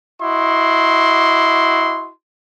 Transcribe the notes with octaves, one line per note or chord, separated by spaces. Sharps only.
E4 F#4 D#5 C6